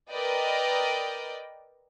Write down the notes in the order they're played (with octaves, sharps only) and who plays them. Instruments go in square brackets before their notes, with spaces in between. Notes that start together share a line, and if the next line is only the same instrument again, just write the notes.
[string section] A#4 B4 D5 D#5 G5